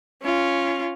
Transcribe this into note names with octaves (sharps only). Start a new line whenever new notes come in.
C#4 F4